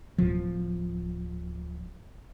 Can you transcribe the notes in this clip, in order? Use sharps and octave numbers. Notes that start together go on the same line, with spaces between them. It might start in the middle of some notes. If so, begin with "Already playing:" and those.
D1 F3